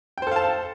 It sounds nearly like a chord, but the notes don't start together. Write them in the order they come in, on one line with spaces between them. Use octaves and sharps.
G5 C5 A4 F5 A5